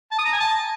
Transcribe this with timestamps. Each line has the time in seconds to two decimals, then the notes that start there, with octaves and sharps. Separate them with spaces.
0.11 A5
0.18 D#6
0.26 A#5
0.33 G#5
0.40 A5